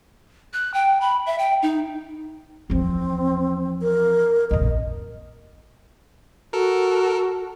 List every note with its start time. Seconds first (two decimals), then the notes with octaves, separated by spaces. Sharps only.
0.53 F#6
0.74 G5
1.01 B5
1.26 E5
1.39 G5
1.63 D#4
2.70 E2 F3 C4
3.82 A#4
4.51 A#1 F2 D#5
6.53 F#4 A4 A#4